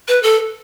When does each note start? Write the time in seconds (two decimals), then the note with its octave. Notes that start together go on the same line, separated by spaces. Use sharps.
0.08 B4
0.23 A4